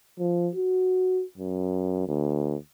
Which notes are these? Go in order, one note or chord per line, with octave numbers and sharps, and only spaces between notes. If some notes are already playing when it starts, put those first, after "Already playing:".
F3
F#4
F#2
D2